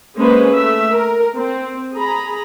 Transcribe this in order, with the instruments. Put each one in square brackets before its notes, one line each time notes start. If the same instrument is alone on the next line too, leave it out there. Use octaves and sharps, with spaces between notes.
[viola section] G#3 A#3 C#4 G#4 B4 C5
A3 E5
A#4
C4
G#4 A#5 B5